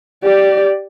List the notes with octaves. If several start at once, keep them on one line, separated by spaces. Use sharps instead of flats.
G4 D5